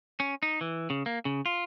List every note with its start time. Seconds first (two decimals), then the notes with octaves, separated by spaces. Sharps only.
0.20 C#4
0.43 D#4
0.61 E3
0.90 C#3
1.06 A#3
1.25 C#3
1.46 F4